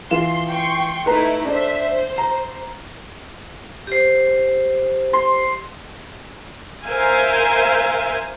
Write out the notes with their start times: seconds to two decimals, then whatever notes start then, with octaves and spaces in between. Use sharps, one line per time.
0.11 E3 F4 C6 E7
0.49 G5 C6 C#6
1.06 A3 D#4 E4 B4 A#5
1.45 D4 C5 E5
1.79 C5
2.18 A#5
3.87 G4 C5
5.13 C6
6.86 A#4 C5 E5 F5 G#5